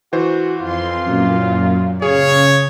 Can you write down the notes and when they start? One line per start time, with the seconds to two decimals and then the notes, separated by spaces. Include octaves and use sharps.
0.13 E3 F#4 C5
0.60 F2 F4 C6
1.03 F#2 A#2
2.02 C#3 G#4 C#5 F5